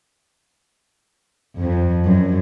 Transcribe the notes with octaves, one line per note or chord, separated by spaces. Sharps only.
F2
F#2